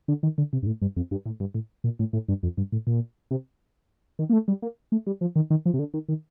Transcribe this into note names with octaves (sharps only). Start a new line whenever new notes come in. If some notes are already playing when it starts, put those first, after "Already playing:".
D3
D#3
D3
C3
G2
A2
G2
F2
G2
A2
G2
A2
A#2
A2
A2
G2
F2
G2
A2
A#2
C3
D#3
A#3
A3
G3
A#3
A3
G3
F3
D#3
D#3
F3
C3
D3
D#3
D#3